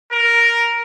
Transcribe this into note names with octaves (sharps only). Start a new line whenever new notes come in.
A#4